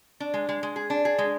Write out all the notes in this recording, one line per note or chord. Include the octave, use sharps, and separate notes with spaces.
D4
G#3
G#3
G#3
G#4
D4
G#4
G#3